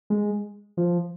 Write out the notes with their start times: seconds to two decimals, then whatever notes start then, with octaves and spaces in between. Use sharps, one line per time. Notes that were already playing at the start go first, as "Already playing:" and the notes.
0.10 G#3
0.77 F3